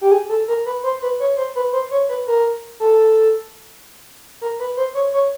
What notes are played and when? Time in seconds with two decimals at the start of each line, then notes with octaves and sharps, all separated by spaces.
0.01 G4
0.12 G#4
0.29 A4
0.48 A#4
0.66 B4
0.83 C5
1.02 B4
1.20 C#5
1.37 C5
1.55 B4
1.73 C5
1.91 C#5
2.09 B4
2.27 A#4
2.80 A4
4.41 A#4
4.60 B4
4.77 C5
4.95 C#5
5.13 C#5